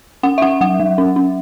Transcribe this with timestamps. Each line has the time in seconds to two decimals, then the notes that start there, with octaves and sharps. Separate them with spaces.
0.23 C#4 F#5
0.38 E5
0.42 C#4 F#5
0.61 F#3 F#5
0.80 F#3
0.98 C#4
1.16 C#4